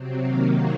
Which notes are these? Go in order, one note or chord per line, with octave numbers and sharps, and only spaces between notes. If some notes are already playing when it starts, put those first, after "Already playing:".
Already playing: C3 F#3 C4
C3 D#3 F#3 A#3 F5